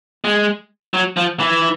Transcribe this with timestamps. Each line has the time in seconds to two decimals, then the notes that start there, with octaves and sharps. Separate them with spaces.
0.24 G#3
0.94 F#3
1.17 F3
1.40 E3